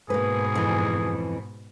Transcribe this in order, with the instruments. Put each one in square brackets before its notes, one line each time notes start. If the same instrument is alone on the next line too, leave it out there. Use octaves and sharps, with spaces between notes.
[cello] G#2 B2 [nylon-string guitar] A#3 B4 [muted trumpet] G#4
[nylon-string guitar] F2 E3